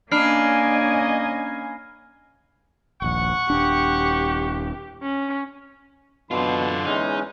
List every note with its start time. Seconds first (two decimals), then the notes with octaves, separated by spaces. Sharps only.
0.12 A#3 C#4 D4 D#5 G#5 B5 F6 C7
3.02 D#1 A#1 F#5 C#6
3.50 D#1 D4 G4
5.02 C#4
6.31 F#2 B2 D3 F4 C6
6.86 E2 G#3 C#4 D#4